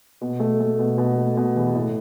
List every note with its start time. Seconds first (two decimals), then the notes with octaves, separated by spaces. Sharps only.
0.21 B2
0.40 A3
0.60 A3
0.79 B2
0.98 B2
1.17 A3
1.37 B2
1.56 E2
1.75 A2